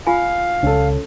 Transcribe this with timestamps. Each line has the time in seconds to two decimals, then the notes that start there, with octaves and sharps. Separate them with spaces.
0.07 F4 F5 G#5
0.63 C#2 C#4 A4